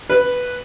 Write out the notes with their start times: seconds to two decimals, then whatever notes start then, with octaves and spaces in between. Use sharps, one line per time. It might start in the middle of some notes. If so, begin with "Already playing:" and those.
0.09 B4